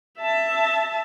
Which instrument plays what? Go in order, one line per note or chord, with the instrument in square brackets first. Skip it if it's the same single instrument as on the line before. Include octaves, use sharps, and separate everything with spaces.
[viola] E5 A5